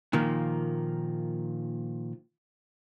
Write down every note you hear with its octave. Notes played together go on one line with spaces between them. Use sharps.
A#2 D#3 F3 A#3